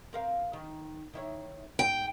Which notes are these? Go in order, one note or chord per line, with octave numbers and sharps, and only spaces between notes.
C4 A#4 F5
D#3
D#3 E4 C#5
G#2 G5